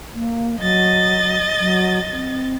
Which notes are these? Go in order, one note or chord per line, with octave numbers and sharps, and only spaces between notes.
A#3
F#3 D#5 A6
F#3
C4